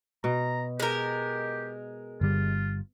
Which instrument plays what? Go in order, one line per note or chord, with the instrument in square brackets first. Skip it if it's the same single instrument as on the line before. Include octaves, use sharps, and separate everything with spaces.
[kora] B2 [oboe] A#5
[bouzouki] G#3 A#4 [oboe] G4
[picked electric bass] G1 G3 [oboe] F4